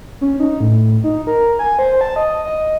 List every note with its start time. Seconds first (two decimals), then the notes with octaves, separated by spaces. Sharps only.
0.21 C#4
0.40 D#4
0.60 A2
1.04 D#4
1.27 A#4
1.59 G#5
1.79 C5
2.01 A5
2.16 D#5
2.45 D#5